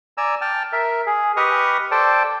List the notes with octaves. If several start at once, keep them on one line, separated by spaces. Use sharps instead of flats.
D5 G#5 A#5 E6
G5 A5 F6
A#4 E5
G#4
G4 B4 D#5 C#6 D#6 F6
A4 C5 D5 G5 A5